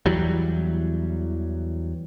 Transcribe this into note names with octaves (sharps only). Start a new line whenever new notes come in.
E2 E3 F#3 G3